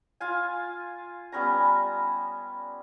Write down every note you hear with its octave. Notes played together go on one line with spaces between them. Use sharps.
F4 F5 G#5
G3 B3 C#4 A#5